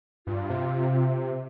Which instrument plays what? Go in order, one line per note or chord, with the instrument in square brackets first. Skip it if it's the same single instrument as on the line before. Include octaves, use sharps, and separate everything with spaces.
[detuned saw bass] G2 [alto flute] F4
[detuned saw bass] C3